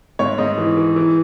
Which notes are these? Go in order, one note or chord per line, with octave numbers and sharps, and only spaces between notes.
G#2 C#5
G#2 D#5
E3
E3
E3